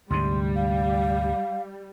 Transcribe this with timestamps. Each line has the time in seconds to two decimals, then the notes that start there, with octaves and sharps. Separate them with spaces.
0.10 D2 G#2 C3 G3 C6
0.56 F5